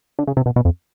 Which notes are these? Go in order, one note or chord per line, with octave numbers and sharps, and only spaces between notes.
D3
C#3
C3
B2
B2
F2